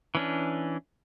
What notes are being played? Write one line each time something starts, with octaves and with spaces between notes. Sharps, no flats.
E3 C#4 D4